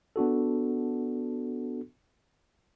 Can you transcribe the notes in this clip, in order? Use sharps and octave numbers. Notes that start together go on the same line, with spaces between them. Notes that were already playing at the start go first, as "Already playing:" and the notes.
B3 D4 F#4 A4